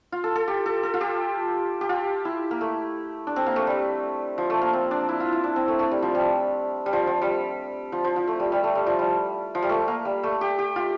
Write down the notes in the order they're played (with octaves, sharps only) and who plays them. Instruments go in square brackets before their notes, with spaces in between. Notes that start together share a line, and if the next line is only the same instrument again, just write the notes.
[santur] F4
A4
A4
G4
A4
A4
F4
G4
G4
F4
E4
A#3
A3
D4
C4
A#3
A3
G3
F3
A3
A#3
C4
D4
E4
F4
E4
D4
C4
A3
A3
G3
F3
G3
G3
F3
F3
G3
F3
F3
F3
A3
G3
G3
A3
G3
F3
G3
F3
G3
A3
A#3
G3
A3
G4
G4
F4